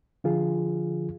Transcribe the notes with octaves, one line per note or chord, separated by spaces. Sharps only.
D3 F3 F4 G#4